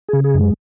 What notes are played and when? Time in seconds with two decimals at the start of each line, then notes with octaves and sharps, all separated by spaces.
0.09 C#3 G#4
0.24 G#4
0.34 F#2
0.39 G#3